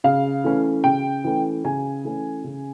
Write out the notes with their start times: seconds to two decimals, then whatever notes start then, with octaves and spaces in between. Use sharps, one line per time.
0.04 C#3 F5
0.44 E3 A3 C#4
0.84 C#3 G5
1.24 E3 A3 C#4
1.64 C#3 G#5
2.04 E3 A3 C#4
2.44 C#3